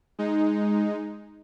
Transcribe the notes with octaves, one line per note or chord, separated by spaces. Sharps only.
G#3 D#4